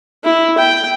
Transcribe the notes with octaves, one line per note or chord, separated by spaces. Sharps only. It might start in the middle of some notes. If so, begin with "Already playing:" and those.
E4
G5